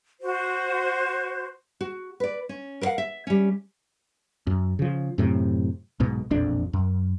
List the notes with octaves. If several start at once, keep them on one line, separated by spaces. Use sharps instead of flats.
F#4 C5
F#4
B4 D5
C#4
A#4 B4 D5 F5 F#5
E5
G3 C#4
F#2
C#3 F3
F#2 A2 C3
B1 G#2 B2
E1 A#1 F2 D4
F#2